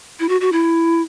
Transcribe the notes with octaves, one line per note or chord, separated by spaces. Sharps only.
E4
F#4
F#4
E4